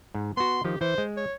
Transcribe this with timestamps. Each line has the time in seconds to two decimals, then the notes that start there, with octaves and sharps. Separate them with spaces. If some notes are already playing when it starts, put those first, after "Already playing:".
0.14 G#2
0.37 B3 F#4 C6
0.65 D#3 F3 G4
0.81 E3 C5
0.98 G#3
1.17 C#5